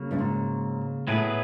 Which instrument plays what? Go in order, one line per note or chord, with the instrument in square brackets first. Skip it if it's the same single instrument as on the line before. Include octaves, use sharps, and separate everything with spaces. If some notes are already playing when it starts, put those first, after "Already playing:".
Already playing: [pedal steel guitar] C#3 F#3 A#3
[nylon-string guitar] G2
G#2
[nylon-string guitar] A2 [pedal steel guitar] F#3 B3 E4 G#4 B4